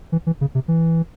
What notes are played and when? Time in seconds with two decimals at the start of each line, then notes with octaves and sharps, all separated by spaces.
0.12 E3
0.27 E3
0.41 C#3
0.55 C3
0.68 E3